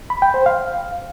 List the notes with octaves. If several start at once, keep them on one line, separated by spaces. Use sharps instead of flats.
B5
G5
C5
F5